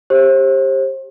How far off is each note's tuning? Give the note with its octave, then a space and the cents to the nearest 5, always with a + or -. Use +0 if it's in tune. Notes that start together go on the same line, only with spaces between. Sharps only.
G4 +15 C5 +35